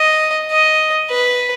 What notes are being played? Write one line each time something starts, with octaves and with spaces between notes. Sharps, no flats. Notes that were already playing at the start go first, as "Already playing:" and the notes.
Already playing: D#5
D#5
B4